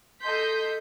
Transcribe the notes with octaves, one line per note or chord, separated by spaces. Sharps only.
A4 D#5 C6 G6 B6